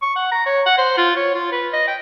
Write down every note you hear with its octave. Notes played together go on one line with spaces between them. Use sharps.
C#6
F#5
A#5
C#5
F#5
C5
F4
C#5
F4
B4
D#5
G5